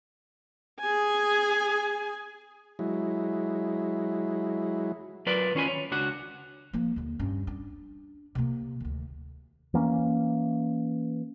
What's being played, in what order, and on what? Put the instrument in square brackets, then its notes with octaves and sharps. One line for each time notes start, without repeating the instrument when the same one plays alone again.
[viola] G#4 G#5
[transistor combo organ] F#3 G#3 E4
[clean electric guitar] F#3 F4 A#4 B4 D5
D#3 C#4 F4 G#5 B5
C#5
C#2 D4 F#4 F#5
[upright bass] F3 A#3
D#2 D3
G2 C#4
D4
C3 A#3
D2 D#3
[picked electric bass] E3 A#3 C#4